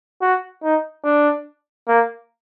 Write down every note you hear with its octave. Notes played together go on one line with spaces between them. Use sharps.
F#4
D#4
D4
A#3